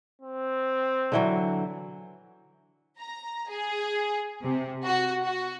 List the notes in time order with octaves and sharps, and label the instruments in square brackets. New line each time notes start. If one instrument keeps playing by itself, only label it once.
[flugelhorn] C4
[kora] D3 E3 F#3
[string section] A#5
G#4
C3
F#4
F#4